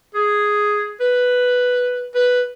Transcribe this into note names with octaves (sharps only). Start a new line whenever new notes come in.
G#4
B4
B4